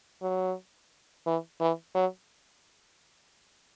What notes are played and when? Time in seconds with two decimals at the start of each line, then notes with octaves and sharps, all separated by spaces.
0.22 F#3
1.26 E3
1.61 E3
1.95 F#3